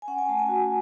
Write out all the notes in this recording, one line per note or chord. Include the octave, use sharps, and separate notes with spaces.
G#5
C#4 F#5
G#5
A3 A5
G#5
F#4